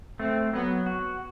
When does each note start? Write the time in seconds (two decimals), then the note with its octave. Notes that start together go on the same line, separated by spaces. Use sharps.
0.20 A3 C4
0.53 F#3 B3
0.86 F#4